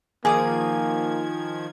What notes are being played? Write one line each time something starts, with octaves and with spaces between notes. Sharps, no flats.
D#3 F3 A#3 G#4 D6 D#6 G#6